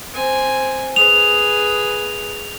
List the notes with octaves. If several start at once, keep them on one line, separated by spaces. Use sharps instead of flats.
C4 G#5
G#4 B4 F7